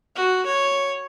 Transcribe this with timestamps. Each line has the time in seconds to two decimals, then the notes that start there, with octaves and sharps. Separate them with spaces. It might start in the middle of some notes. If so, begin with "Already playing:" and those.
0.16 F#4
0.46 C#5